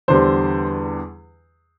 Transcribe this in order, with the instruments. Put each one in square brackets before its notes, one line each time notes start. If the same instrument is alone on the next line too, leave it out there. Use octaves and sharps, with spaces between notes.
[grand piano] E2 D3 G3 C5